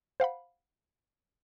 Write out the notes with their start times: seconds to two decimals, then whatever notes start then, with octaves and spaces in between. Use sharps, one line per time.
0.20 C5 F5 F#5 B5